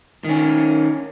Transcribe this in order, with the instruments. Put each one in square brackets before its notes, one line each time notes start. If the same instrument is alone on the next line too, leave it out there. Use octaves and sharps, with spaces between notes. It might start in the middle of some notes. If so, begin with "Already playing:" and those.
[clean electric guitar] D#3 C#4